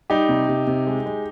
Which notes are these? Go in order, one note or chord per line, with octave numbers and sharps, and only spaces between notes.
G3 D#4 G4
C3
C3
C3
G#3
G#3